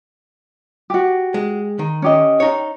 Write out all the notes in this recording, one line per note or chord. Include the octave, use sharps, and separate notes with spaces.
F#4 G4
G#3
D#3
C#4 G4 D#5
D#4 C#5